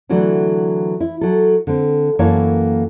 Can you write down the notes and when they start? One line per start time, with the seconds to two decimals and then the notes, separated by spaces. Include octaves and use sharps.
0.09 D3 E3 F#3 A3 D4
1.00 E4
1.21 F#3 A4
1.67 D3 C4
2.19 F#2 E3 A#3 A4 C#5 A5